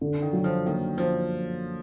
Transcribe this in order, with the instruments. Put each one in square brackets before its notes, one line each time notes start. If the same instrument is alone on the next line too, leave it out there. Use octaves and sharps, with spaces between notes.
[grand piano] D3
[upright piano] D#3
[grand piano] F#3
[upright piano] F3
[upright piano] D#3 [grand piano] A#3
[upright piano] F3 [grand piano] D4